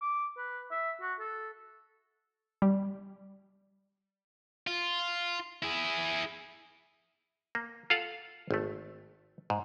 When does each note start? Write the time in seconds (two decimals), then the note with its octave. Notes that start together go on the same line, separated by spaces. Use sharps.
0.01 D6
0.37 B4
0.71 E5
1.01 F#4
1.20 A4
2.62 G3
4.67 F4
5.63 E4 G#4
7.55 A#3
7.90 F4 A4 F5 F#5
8.51 G#1 A3
9.50 G#2